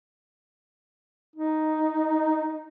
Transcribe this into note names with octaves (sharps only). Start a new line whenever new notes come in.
D#4